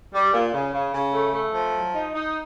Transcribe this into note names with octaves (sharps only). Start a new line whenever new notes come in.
G3
A#2
C#3
C#3
C#3
A3
A3
F3
F#3
D#4
D#4